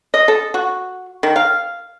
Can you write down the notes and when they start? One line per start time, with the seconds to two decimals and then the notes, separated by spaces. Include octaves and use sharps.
0.14 D#5
0.28 A4
0.54 F#4
1.23 D#3
1.36 F5